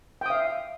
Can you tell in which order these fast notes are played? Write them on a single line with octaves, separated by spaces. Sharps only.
G5 D#6 F5 E5